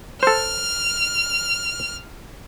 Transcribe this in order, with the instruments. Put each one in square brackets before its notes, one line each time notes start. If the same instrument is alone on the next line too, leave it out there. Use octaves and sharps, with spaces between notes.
[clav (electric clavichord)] A4 C5 [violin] F6